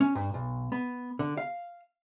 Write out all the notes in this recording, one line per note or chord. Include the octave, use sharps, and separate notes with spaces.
C#4
G2
B1
B3
D3
F5